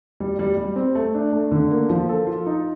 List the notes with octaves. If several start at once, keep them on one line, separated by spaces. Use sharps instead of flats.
G3
G3
G3
C4
A3
D4
A3
D3
A#3
F3
A4
F4
D#4